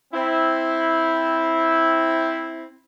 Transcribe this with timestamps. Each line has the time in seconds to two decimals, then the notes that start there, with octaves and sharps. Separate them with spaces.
0.14 C4 E4